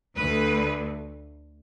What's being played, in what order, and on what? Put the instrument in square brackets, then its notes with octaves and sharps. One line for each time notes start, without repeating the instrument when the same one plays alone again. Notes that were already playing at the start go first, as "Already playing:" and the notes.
[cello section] D2 D3 A3 B4